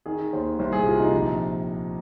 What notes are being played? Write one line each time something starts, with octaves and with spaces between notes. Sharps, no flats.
D#3 G#4
D#2 C5
C2 C5
G#4
C3 F4
D#4
A#1